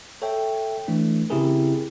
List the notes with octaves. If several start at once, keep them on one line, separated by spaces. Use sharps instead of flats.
A4 C#5 E5 G5
E3 A3 D4
C#3 C4 E4 G4 G#4 A#4